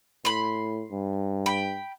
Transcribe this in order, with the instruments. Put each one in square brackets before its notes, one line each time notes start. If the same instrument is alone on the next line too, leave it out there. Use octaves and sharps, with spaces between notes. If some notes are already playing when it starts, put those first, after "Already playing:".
[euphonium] A2 [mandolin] B5 C6
[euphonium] G2
[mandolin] G5 B5